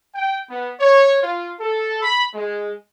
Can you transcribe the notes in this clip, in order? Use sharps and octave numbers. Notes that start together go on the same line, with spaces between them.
G5
B3
C#5
F4
A4
B5
G#3